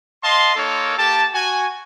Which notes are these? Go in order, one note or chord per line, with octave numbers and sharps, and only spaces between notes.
D#5 F5 A5 C6
A#3 D#4 A4 A#4 C#5
A#3 G4 A5
F#4 G#5